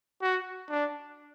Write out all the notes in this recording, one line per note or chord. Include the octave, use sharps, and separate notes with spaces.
F#4
D4